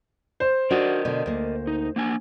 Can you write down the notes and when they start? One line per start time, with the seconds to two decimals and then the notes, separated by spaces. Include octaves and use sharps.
0.40 C5
0.70 D4 F#4 A#4 D5 D#5
1.05 B2 D3
1.26 D2 A#3
1.67 D#4
1.96 A#3 D4 G#5